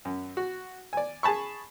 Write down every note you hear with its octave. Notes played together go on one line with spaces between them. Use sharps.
F#2
F#4
D5 G#5
G#4 G#5 A5 B5 C#6